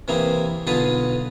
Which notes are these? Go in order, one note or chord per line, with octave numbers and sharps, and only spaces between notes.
C3 E3 A#3 E4 G#4
B1 D3 F4 G#4 B4 D#6